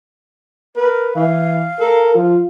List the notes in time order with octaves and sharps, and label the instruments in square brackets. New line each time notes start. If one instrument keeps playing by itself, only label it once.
[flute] A#4 [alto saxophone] B4
[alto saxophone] E3 [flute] F5
[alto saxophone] A4 [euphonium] A#4
[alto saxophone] F3 [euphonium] F4